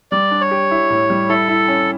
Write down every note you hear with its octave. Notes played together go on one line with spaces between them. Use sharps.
G3 D5
D4
C#5
G4
E4
A2
G3
E4 A4
E4
C#4